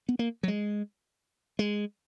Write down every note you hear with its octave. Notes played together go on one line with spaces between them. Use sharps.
B3
A#3
F#3
G#3
G#3